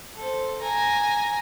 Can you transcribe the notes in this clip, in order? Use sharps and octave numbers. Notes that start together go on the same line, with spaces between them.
A4 C5
G#5 A#5